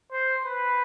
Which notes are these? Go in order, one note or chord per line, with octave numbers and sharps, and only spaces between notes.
C5
B4